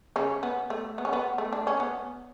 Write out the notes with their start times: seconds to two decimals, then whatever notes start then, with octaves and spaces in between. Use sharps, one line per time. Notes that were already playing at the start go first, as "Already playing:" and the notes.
0.16 C#3 C#4
0.43 B3
0.70 A3
0.98 B3
1.05 C#4
1.13 B3
1.38 A3
1.53 D4
1.67 C#4
1.80 B3